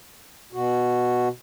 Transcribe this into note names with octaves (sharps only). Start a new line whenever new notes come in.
B2 F#4